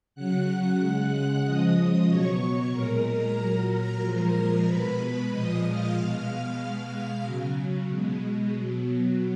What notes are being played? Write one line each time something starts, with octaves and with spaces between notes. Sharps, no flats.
C#3 F#3 F#5 F#6
C#3 G#3
C#3 F3 G#3 D#5 D#6
B2 F#3 C#5 C#6
A#2 G#3 A#4 A#5
A#2 F#3
A#2 F3 G#3
B2 G#3 B4 B5
A#2 F3 G#3 D#5 D#6
F5 F6
B2 G#3 F5 F6
B2 G#3
C#3 F#3
B2 G#3
B2 F#3